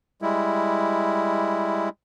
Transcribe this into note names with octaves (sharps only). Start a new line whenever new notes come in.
G3 G#3 E4